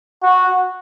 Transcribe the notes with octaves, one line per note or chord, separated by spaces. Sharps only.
F#4